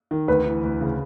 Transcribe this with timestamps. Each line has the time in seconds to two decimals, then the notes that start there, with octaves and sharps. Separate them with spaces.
0.11 D#3
0.28 D2 B4
0.46 E3
0.63 D2
0.81 C#3